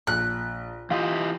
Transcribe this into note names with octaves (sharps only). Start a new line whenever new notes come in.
A#1 F#6
E3 F4 G4 D#5